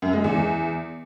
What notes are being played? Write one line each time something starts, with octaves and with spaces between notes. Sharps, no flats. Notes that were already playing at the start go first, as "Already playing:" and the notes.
F#2
G#3
E2